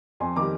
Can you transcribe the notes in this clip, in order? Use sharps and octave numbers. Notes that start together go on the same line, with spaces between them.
F2 G#5 C6
D#3 G3 A#5 D6